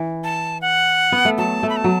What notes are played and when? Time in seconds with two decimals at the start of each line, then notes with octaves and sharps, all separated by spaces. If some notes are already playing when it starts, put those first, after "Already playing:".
Already playing: E3
0.24 A5
0.62 F#5
1.12 B3
1.25 A3
1.38 F#3 A5
1.63 A3
1.69 B5
1.77 A5
1.84 F#3